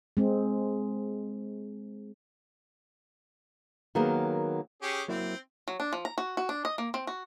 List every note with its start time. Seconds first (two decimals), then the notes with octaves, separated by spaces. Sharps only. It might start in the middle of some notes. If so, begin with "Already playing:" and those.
0.17 G#3 C4
3.95 D#3 F#3 A#3 B3 G#4 A#4
4.82 C#4 G4 G#4
5.08 F#3 A#3 C4 E4
5.68 F#3
5.80 D4
5.93 F3
6.05 A#5
6.18 F#4
6.37 F#4
6.49 D4
6.65 D#5
6.78 A#3
6.94 C4
7.07 F#4